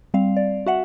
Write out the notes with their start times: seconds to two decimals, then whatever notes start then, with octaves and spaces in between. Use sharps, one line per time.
0.14 G3 C4 F5
0.37 D5
0.66 F#4 E5 F#5